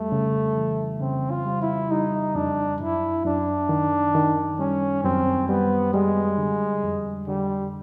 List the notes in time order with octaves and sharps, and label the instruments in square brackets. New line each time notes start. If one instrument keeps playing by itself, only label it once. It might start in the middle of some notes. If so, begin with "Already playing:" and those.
Already playing: [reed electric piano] F2 G3 [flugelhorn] A3
[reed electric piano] C#3
E3
[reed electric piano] C#3 [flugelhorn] C4
[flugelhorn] F4
[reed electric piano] G3
[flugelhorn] E4
[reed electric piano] G3 [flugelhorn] D#4
[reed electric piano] F2 [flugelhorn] D4
[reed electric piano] F#2 [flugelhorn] E4
[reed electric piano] F#2 [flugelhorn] D4
[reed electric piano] D#3
D#3
[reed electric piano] G3 [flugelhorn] C#4
[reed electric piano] F#2 [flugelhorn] C4
[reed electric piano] G3 [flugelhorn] B3
[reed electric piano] G3 [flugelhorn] G#3
[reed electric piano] D3
F2
[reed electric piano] D3 [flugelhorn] G3